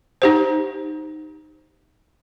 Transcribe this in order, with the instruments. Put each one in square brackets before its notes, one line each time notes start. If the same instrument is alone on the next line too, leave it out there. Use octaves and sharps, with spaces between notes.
[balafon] D#4 G4 C5